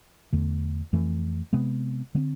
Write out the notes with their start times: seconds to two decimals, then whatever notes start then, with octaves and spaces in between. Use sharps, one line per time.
0.33 E2 D3 A3
0.93 F2 E3 A3
1.53 C3 G#3 B3
2.15 D3 G#3 C4